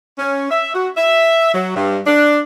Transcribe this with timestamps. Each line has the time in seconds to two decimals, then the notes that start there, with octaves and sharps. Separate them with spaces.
0.19 C#4
0.51 E5
0.75 F#4
0.97 E5
1.55 F#3
1.76 G2
2.07 D4